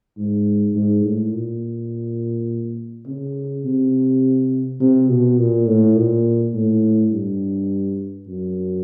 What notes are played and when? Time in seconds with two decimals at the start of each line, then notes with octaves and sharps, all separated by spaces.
0.18 G#2
0.75 G#2
1.05 A2
1.33 A#2
3.07 C#3
3.64 C3
4.80 C3
5.09 B2
5.38 A#2
5.68 A2
5.96 A#2
6.54 A2
7.12 G2
8.28 F#2